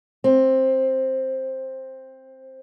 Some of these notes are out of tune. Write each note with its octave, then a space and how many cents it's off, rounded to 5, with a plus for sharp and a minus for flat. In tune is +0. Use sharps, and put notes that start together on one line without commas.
C4 +10